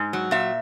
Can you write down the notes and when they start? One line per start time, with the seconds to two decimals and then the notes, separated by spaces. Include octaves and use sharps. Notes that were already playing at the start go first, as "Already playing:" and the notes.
Already playing: G#2
0.13 F#3
0.31 A#2 E5